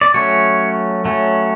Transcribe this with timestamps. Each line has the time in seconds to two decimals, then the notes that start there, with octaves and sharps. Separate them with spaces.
0.01 D5
0.14 F#3 A3 C#4 C#5
1.05 F#3 A3 C#4